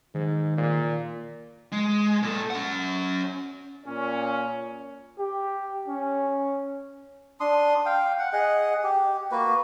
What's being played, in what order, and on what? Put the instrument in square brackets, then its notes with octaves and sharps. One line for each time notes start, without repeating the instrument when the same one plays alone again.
[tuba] G#2 [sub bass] D#3
[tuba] A#2
[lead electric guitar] G#3
A#2 A4
C#4 F#5
[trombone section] A#2 C#4
[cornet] G4
C#4
[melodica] D4 C6 D#6
F5 G5
F#5
G#4 D#5 F#5
G4
A#3 F#4 B4